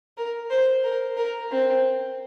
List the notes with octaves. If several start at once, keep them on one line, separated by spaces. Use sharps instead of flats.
A#4
C5
A#4
A#4
C4